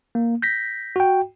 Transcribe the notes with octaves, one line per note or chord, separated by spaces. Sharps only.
A#3
G6 A#6 B6
F#4 G5